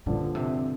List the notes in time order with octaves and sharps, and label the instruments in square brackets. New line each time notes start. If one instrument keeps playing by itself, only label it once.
[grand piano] G2 D3 F3 [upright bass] A#2
[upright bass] C3